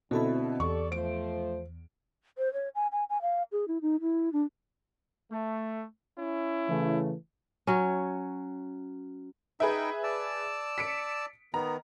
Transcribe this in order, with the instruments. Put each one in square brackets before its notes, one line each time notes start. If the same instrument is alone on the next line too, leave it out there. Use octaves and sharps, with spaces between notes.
[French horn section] D2 [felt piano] B2 D3 E4 [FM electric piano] C4 A4 A5
[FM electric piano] E2 [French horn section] G4 A4 D5 [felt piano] C#6
[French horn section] F3 A3 C5 [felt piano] D7
[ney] C5
C#5
G#5
G#5
G#5
F5
G#4
E4
D#4
E4
D4
[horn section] A3
C#4 E4
[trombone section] C#3 E3 A3
[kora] F#3 C#4
[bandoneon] D#4 G5 [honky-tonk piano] G#4 B4 E5
[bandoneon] D5 A5 E6
[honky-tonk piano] B6 C#7 D7
[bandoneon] D#3 B3 [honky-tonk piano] A#5